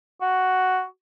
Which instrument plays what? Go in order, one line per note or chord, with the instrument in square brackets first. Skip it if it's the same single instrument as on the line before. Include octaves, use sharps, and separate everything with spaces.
[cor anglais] F#4